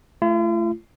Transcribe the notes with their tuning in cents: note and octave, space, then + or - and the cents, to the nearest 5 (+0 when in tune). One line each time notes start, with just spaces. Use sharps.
A3 -5 F4 -45